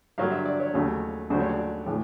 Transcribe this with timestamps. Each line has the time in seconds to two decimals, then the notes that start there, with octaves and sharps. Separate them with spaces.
0.18 G2 D3 F#3 A#3 F5
0.32 E5
0.46 D5
0.60 C#5
0.74 D#2 C#3 F#3 A3
1.30 D#2 C#3 F#3 A3 D4 C5
1.40 C#5
1.49 D5
1.86 A2 E3 G#3